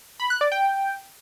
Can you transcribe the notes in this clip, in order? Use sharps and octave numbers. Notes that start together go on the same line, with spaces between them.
B5
F#6
D5
G5